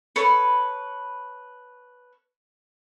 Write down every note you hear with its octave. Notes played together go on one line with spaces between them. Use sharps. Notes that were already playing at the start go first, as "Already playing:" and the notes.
A4 B4 C#5 B5